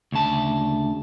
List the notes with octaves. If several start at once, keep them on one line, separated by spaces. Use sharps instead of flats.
D2 C#3 A5